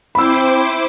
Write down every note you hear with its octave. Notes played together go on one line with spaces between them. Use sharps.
C4 E4 C5 B5 D6 E6